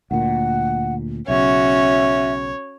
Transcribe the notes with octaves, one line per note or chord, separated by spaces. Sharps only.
D2 A#2 F#5
B1 C#3 C#4 F#4 C#5 E5